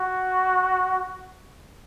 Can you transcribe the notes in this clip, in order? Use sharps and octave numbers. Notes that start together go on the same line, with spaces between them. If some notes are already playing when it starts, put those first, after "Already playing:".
Already playing: F#4